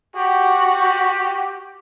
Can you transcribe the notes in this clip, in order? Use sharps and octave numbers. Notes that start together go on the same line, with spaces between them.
F#4 G4